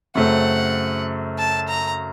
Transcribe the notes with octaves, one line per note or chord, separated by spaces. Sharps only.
F#2 C#3 A3 C4 F#5
A5
A#5